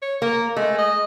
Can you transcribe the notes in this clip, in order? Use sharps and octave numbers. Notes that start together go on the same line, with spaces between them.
C#5
A#3 A#4
G#3 A3
D#5